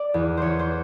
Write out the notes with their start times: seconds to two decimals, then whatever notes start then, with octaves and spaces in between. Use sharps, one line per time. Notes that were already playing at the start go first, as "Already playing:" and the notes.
Already playing: D5
0.14 E2
0.37 E3 C5 C#5
0.59 C5